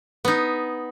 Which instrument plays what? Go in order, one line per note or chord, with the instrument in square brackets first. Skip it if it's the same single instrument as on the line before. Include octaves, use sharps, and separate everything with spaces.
[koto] B3 D#4